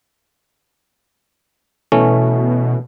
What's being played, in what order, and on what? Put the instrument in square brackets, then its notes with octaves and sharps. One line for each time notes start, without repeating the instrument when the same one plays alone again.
[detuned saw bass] B2 [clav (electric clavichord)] E3 A3 C#4